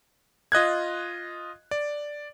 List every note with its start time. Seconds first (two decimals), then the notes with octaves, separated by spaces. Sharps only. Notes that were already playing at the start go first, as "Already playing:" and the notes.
0.52 F4 D#5 F#6 G#6
1.71 D5